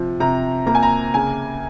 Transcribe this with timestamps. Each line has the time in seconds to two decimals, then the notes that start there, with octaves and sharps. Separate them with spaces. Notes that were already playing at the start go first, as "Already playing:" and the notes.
Already playing: C3 F3
0.20 C3 A#5
0.66 A#3 A#5
0.75 G#5
0.83 A#5
1.14 C#3 G#5